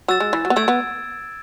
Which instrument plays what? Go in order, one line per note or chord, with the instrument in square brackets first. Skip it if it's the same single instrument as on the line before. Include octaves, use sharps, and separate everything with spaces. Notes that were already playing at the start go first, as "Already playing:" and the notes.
[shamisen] F#3 [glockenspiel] E6 A6 E7
[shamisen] G#3
E3
F#3
B3
[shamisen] A3 [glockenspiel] E6 G#6 D7
[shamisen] B3